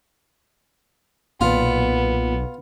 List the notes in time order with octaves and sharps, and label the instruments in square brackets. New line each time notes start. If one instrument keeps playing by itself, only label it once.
[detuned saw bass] B1 [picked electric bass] A#2 [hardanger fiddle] B3 [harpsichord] F4